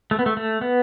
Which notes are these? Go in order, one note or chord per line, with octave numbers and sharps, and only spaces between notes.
A3
B3
A3
A3
B3